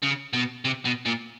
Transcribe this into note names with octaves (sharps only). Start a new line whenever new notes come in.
C#3
B2
C3
B2
A#2